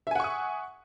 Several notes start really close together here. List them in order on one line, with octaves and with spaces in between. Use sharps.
E5 G#5 F#5 C#6 D#6